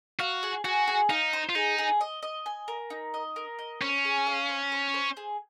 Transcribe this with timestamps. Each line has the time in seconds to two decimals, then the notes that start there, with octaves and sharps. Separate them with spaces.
0.19 F#4 F5
0.43 G#4
0.64 F#4 G#4
0.88 G#4
1.09 D#4 F5
1.33 C5
1.49 F4
1.55 D#4 G#4
1.78 G#4
2.01 D#5
2.23 D#5
2.46 G#5
2.68 A#4
2.90 D#4
3.14 D#5
3.36 A#4
3.59 D#5
3.81 C#4 C5
4.05 G#4
4.27 F5
4.49 C5
4.72 C5
4.94 C5
5.17 G#4